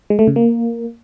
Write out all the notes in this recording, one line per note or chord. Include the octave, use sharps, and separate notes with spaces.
G#3
A3
C#3
A#3